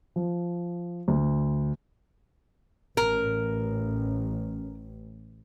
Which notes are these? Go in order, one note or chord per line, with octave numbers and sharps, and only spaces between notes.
F3
D2
A1 A#4